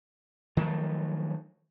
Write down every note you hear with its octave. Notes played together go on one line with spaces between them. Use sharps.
D#3 F3 F#3 A3